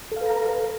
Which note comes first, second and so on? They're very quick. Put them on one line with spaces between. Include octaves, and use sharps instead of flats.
A4 F5 B4 A#5